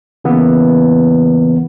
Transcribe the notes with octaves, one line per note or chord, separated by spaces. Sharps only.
C#3 E3 A#3 B3